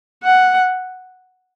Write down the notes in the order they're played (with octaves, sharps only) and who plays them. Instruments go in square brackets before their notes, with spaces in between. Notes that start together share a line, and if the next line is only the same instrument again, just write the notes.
[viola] F#5